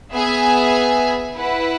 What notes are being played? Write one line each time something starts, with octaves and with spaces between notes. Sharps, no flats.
B3 G#4 E5 G#5
E4 B4 F#5